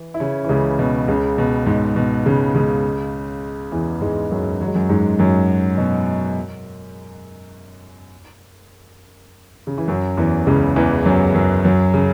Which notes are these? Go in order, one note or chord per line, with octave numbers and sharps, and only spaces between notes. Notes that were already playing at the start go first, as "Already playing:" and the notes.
Already playing: E3
E4
C#3 C#4
E3
C#2 C#3
B2
C#2 C#3
B2
G#2
B2
C#2 C#3
C#2 C#3
E2 E3
G#2 G#3
F#2 F#3
F#3
G#3
F#2 F#3
G#2 G#3
F#2 F#3
B2
C#3
E3
F#2 F#3
E2 E3
C#2 C#3
E2 E3
F#2 F#3
F#2 F#3
F#2 F#3
C#3